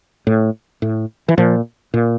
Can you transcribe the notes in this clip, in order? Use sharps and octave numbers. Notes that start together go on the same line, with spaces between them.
A2
A2
E3
A#2 F3
A#2